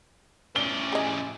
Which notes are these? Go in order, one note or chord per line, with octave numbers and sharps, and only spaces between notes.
A2 C#3 D5 G7
G#4 D#5